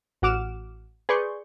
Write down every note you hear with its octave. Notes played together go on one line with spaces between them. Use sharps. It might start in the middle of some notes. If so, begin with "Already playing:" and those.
A1 F#4 F#5 D6 F6 E7
G#4 B4 D5 C6 C#6 G6